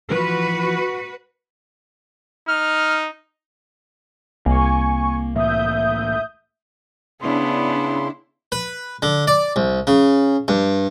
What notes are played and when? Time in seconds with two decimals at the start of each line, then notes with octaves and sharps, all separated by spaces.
0.11 E3 F3 F#4 B4
2.48 D#4 F6
4.46 C2 A#3 G#5 C#6
5.36 A2 E3 A#3 E5 D#6 G6
7.22 C#3 B3 D4 E4 C6
8.52 B4
9.02 D3
9.27 D5
9.56 C2
9.87 C#3
10.48 G2